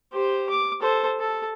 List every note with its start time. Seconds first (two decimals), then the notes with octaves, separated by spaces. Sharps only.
0.13 G4 C5
0.50 D6
0.81 A4 C5
1.20 A4